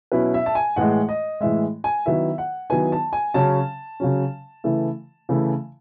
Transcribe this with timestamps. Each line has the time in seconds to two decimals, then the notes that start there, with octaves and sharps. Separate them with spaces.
0.12 B2 F#3 C#4 E4 B4
0.34 E5
0.46 A5
0.55 G#5
0.76 A2 E3 G#3 F#5
1.09 D#5
1.41 A2 E3 G#3 E5
1.84 G#5
2.06 D#3 F#3 B3 E4 E5
2.38 F#5
2.70 D#3 F#3 B3 E4 G#5
2.92 A5
3.13 G#5
3.34 C#3 F#3 C#4 A5
4.00 C#3 F#3 C#4
4.64 C#3 E3 A3 E4
5.29 C#3 E3 A3 E4